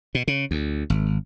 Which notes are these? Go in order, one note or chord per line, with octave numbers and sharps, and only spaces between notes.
B2
C#3
D2
G#1